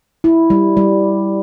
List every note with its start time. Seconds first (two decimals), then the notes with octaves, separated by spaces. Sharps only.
0.24 E4
0.50 G3
0.77 G3